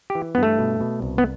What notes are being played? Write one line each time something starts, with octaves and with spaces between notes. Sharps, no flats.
G4
E3
B3
G2
A3
B2
B2
C2
B3